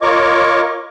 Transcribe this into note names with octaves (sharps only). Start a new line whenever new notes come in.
F4 A#4 C#5 D#5 C#6 D6